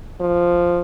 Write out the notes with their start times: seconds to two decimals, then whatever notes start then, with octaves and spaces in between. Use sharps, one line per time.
0.20 F3